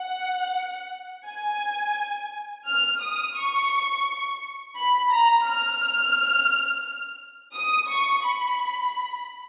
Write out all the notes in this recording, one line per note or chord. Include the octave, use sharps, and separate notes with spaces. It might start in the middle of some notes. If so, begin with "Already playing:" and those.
Already playing: F#5
G#5
F6
D#6
C#6
B5
A#5
F6
D#6
C#6
B5